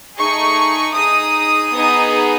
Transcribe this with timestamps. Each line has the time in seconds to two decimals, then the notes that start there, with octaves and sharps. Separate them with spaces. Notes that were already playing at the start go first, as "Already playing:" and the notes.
0.16 A3 D#4 G#4 C#6
0.95 D#4 G#4 D#6
1.73 B3 D#4 G#4